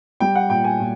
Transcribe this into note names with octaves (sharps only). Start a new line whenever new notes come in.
G3 G5
F#5
A#2 G5
G#5
A#2